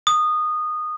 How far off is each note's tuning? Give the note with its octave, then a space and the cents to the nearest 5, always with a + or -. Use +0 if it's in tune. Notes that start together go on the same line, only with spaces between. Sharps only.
D#6 -20